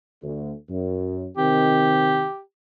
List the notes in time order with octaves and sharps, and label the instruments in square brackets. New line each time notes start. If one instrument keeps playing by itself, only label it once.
[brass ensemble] D2
F#2
[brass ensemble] C3 D#3 C4 [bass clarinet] G4